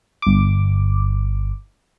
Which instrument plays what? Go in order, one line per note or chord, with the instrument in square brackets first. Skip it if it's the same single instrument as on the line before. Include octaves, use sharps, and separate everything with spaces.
[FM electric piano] G1 D6